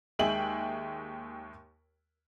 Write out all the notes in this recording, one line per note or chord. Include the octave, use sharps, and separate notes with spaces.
D#2 G#3 E5 G5 G#5 F#7